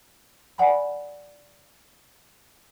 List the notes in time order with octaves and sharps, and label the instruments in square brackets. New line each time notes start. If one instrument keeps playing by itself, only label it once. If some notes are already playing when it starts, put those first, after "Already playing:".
[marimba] D5 F#5 G#5 B5